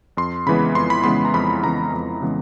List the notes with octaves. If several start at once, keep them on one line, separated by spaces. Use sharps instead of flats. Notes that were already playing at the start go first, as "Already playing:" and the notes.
F2 C6
C#3 E3 G#3 B3 B5
F2 C6
B5
C#3 E3 G#3 B3 C6
A#5
F2 B5
C#3 E3 G#3 B3 A#5
F2
C#3 E3 G#3 B3